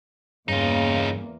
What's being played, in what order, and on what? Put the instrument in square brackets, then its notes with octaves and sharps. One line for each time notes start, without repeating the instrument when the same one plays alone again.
[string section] E2 A#3 [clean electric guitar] G2 [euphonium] C#3 [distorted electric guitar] D#4 F4